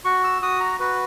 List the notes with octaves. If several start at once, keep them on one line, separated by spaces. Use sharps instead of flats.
F#4 C#6
E6
F#4 D#6
A#5
F#4 B4